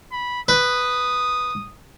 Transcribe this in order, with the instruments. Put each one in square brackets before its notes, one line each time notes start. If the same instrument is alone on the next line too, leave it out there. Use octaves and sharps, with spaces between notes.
[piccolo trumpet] B5
[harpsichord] B4 [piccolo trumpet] D#6